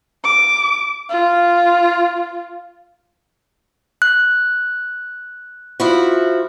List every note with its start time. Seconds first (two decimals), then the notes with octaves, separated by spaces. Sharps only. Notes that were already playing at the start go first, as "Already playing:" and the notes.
0.24 D6
1.10 F4
4.02 F#6
5.80 F3 E4 F#4